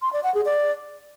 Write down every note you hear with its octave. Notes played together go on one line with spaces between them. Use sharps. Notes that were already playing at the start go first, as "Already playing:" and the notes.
C6
D5
F#5
G#4
D5